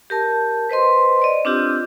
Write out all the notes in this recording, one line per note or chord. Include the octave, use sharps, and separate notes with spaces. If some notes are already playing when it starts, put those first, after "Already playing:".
G4 A#4 A5
B4 C5 D#5 C6
D5 D#5
C4 D4 F4 G4 E6